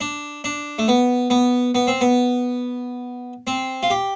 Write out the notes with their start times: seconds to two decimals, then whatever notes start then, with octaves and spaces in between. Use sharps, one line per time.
0.01 D4
0.44 D4
0.78 A3
0.88 B3
1.30 B3
1.75 B3
1.87 C4
2.01 B3
3.47 C4
3.83 F4
3.90 G4